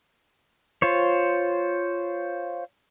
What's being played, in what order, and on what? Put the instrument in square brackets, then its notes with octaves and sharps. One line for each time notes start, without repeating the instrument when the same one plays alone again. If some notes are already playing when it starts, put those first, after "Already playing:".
[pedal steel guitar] F4 C5 C#5